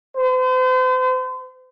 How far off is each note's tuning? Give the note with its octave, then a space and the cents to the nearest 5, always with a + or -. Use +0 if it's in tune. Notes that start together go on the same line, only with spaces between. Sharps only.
C5 -40